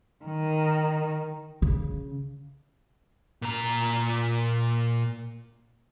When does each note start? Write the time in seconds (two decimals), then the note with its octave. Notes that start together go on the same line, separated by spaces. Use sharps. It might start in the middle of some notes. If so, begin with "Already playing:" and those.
0.25 D#3
1.62 C#3
3.42 A#2 A#5